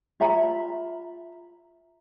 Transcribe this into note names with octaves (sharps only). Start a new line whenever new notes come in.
F4 E5 A#5 B5